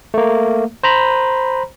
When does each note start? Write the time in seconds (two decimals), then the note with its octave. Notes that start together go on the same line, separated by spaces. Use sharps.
0.14 A3 A#3
0.83 C5 A#5 B5